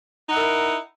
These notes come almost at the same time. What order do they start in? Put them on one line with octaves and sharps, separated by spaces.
D#4 F#5 E4 A#4